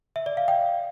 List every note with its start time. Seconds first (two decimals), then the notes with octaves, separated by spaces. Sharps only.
0.16 E5
0.26 D5
0.37 F5
0.48 G5